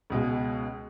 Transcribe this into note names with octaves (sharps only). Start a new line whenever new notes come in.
C#2 B2 G#3